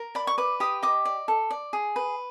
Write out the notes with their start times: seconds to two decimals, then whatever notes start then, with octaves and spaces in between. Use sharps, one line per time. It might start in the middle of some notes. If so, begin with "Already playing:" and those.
Already playing: A#4
0.15 D5 B5
0.27 C#6
0.38 B4 D6
0.60 G4 D#6
0.83 D#5 D6
1.05 D5
1.28 A4
1.51 D5
1.73 G#4
1.96 B4